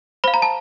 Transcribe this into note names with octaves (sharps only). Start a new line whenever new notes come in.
C5 F5 B5
A#5
A5